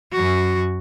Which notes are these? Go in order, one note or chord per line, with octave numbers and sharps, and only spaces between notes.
F#2 F#4